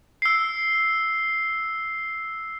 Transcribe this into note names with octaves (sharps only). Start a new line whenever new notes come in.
E6 C7